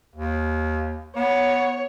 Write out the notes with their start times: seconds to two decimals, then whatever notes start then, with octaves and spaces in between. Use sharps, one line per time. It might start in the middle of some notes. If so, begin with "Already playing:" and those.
0.15 D#2
1.16 B3 C#5